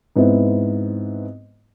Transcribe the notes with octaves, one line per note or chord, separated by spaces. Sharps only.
G#2 B3 C4 E4